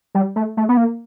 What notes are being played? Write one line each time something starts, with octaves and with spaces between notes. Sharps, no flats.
G3
A3
A3
B3
A#3